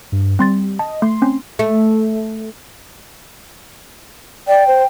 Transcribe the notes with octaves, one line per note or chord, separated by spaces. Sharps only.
G2
G3 C4 C6 A6
D#5 A5
A3 C6
C4 C#4
A3
D5 G5
C5